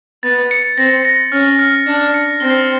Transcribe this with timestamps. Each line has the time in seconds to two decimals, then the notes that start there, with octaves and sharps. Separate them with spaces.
0.23 B3 A6
0.51 C#7
0.78 C4 A#6
1.05 A#6
1.32 C#4 F6
1.59 F6
1.86 D4 C#7
2.14 C#7
2.40 C4 G7